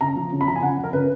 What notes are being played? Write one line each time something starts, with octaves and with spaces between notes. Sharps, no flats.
C#3 A#5
F3
C#3
B5
F3 A#5
G#5
C#3 F#5
F3
A#4
C#3 B4